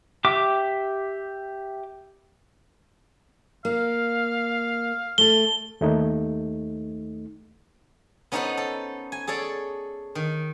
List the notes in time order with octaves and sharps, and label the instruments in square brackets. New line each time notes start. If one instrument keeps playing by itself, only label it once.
[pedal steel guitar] G4 E5 D6
[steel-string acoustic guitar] A#3 [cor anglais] F5
[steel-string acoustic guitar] A3 A4 [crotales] G7
[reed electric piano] D#2 A3 D#4
[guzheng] B3 C#4 D#4 A4 C5 F#5
A4
G#5
G#4 A4 C#5 D5
D#3